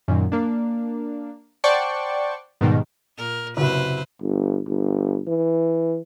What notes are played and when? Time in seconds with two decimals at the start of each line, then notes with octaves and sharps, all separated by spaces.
0.08 F#2 A#2 D#3 F#3
0.32 A#3 D4
1.64 C5 D5 F#5 G5 A5 C#6
2.61 G#2 B2 D#3 G3
3.17 A#2 A#4
3.57 F#1 C3 F#4 B4 C5
4.21 G1
4.67 G1
5.28 E3